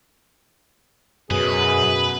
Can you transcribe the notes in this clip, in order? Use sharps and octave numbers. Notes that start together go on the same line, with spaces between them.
F#2 B2 G#4 B4